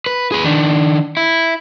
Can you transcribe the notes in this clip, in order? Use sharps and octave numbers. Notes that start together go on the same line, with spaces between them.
B4
G#4 B4
D#3 D4
E4